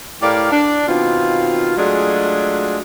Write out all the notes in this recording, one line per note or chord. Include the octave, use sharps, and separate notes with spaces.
A2 G4 A#4 D5 F5
D4
B2 D#3 C4 F4
F#3 G#3 A3 D4 F4 G#4